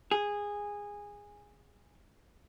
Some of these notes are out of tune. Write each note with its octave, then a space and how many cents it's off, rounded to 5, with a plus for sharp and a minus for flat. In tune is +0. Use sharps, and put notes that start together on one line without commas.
G#4 -15